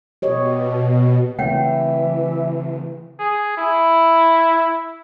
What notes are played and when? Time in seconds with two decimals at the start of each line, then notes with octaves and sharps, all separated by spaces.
0.22 B2 G4 C#5 D#5
1.39 C#3 E3 A3 C4 C#5 E5 F#5 G5
3.19 G#4
3.58 E4